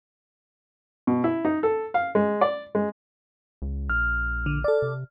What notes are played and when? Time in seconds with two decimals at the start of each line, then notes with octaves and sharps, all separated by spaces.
1.07 B2
1.24 E4
1.45 D#4
1.63 A4
1.94 F5
2.15 G#3
2.41 D5
2.75 G#3
3.62 C#2
3.90 A#1 F6
4.46 D3
4.64 A4 D5
4.82 C3